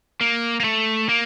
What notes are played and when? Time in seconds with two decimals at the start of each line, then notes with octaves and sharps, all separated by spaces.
0.21 A#3
0.60 A#3
0.64 A3
1.09 A#3